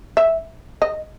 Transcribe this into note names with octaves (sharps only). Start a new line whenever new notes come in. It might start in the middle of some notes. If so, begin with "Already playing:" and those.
E5
D#5